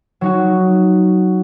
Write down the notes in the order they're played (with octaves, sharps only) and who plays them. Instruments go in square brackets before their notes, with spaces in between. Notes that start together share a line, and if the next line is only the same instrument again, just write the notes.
[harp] F#3 D#4 F#4